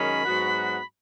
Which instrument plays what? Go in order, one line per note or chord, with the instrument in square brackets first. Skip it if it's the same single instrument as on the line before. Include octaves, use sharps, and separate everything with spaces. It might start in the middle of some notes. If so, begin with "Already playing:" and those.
Already playing: [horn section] F#2 D#3 G#3 C#4 [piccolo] B5
[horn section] G#2 F#3 B3 F#4